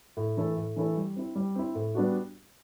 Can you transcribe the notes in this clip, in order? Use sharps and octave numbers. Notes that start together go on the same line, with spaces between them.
A2
E3 A3 E4 A4
A2
E3 A3 E4 A4
G3
C4 E4
G3
C4 E4
A2
G3 B3 D4 F#4